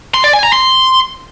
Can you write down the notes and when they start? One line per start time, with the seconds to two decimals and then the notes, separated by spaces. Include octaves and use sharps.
0.14 C6
0.24 D5
0.34 G#5
0.43 A#5
0.53 C6